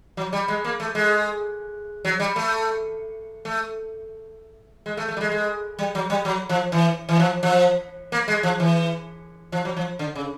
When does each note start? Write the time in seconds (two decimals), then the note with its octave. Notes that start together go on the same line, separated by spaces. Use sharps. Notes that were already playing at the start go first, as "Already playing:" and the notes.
0.17 F#3
0.33 G3
0.48 G#3
0.65 A#3
0.80 A3
0.95 G#3
2.05 F#3
2.20 G3
2.36 A3
3.45 A3
4.86 G#3
4.97 A3
5.09 A3
5.17 G3
5.21 G#3
5.32 G#3
5.79 G3
5.95 F#3
6.10 G3
6.25 F#3
6.49 F3
6.72 E3
7.09 E3
7.20 F3
7.43 F3
8.12 A#3
8.28 G#3
8.43 F3
8.60 E3
9.52 F3
9.65 F#3
9.76 F3
9.99 D3
10.15 C#3